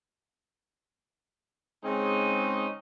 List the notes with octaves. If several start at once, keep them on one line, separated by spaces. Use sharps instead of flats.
C#3 G#3 C4 C#4 D#4